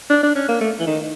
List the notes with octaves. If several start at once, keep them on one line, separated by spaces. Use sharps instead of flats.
D4
D4
C#4
A#3
A3
E3
D#3